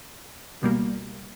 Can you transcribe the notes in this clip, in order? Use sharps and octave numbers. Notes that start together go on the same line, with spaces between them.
C#2 B2 G3 A#3